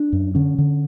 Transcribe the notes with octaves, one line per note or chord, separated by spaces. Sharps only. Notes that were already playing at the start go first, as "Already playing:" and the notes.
Already playing: D4
F#2
D3 C#4
D3